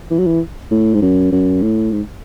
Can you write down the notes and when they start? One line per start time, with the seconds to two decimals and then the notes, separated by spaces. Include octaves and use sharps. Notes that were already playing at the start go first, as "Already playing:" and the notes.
0.11 E3
0.19 F#3
0.27 E3
0.71 A2
0.94 G#2
1.02 F#2
1.32 F#2
1.62 A2
1.92 G#2